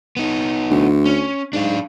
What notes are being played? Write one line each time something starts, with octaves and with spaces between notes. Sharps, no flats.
B3 D#4
D2
C#4
G#2 D4 F5